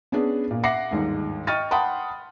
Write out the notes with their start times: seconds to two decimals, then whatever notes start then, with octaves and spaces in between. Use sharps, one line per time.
0.12 B3 C#4 D4 G#4
0.51 A#2
0.63 E5 F#5 D6 A#6 C7 C#7
0.91 G1 D#2 G#2
1.47 D#5 G5 C#6 F6 A6 D#7
1.71 F#5 G5 A5 B5 C6 D#6